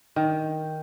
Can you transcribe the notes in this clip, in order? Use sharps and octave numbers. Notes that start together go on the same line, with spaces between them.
D#3